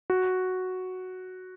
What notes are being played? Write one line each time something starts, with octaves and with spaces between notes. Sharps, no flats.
F#4